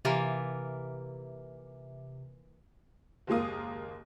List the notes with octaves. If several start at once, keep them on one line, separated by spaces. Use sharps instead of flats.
C3 E3 A#3 F4
F#1 D#2 G#3 A#3 D#6